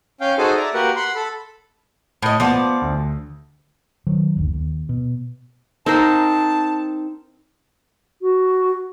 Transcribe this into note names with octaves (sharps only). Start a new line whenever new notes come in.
C#4 F5 G5
D#4 F#4 G#4 A4 C5 G#5
D5 E5 A#5
A#3 F#4 G4 A#4 B4 F#5
F#5 B5 C6
A4 B5
A2 D#5
F3 B3 D5 F#5
D2
D#3 F3 F#3
F#1 D2
D#2
B2
C4 D#4 A#4 C5 F5 A5
F#4